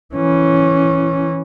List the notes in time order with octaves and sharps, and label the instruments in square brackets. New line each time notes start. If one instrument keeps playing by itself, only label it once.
[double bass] E3 C#4